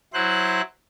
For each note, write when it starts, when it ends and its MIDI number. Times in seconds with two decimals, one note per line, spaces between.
0.14 0.61 54
0.14 0.61 64
0.14 0.61 72
0.14 0.61 90